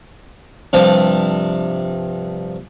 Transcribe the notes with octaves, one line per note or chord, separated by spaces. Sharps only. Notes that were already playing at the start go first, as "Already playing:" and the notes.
G2 C3 F3 A5